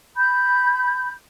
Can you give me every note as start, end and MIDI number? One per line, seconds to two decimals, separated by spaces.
0.16 1.10 83
0.16 1.10 91